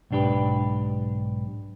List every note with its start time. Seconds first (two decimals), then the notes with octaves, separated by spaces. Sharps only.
0.11 B1 G#2 D4 G4 B4